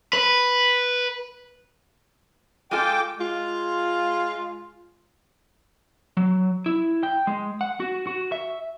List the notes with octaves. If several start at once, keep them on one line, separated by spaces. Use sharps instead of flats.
B4
G#3 F4 A4 G5 D6
G#3 F4
F#3
E4
G5
G#3
F#5
F#4
F#4
E5